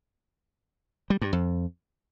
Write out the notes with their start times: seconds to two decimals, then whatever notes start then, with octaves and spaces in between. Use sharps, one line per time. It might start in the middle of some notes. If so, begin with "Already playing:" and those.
1.10 G3
1.21 G2
1.33 F2